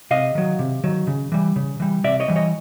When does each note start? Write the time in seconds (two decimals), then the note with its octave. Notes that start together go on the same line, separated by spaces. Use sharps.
0.11 C3 D#5 F5
0.35 D#3 F#3
0.59 C3
0.84 D#3 F#3
1.07 C#3
1.32 E3 G3
1.56 C#3
1.80 E3 G3
2.04 C3 D5 E5
2.20 C#5 D#5
2.28 E3 G3
2.36 C#5 D#5